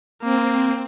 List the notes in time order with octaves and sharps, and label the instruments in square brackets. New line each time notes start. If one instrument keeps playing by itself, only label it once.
[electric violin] A#3 [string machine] C4